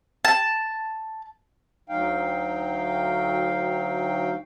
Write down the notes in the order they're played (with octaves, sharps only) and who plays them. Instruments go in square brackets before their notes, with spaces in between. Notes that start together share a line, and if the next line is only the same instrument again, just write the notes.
[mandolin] A5
[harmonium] D2 F#3 D#4 F5 G5